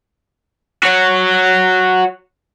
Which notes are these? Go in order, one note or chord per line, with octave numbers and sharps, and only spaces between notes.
F#4 C#5